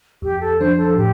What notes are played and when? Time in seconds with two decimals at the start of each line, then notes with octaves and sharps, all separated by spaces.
0.22 F2 G4
0.41 A4
0.59 F3 D4 C5
0.78 A4
0.96 A2 G4